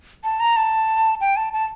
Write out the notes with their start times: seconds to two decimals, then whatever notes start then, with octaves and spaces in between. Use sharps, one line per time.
0.24 A5
0.40 A#5
0.57 A5
1.21 G5
1.36 A5
1.53 A5